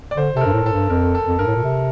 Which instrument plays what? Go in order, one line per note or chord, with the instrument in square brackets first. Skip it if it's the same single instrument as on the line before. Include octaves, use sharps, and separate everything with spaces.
[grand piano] D5
[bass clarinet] D3 [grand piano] C5
[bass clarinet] C3 [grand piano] A4
[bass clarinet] G2 [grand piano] A#4
[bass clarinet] A2
[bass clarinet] A2 [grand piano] A4
[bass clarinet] G2
[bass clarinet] F2 [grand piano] A#4
[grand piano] A4
[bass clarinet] F2
[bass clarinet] G2 [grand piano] A#4
[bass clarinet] A2
A#2
C3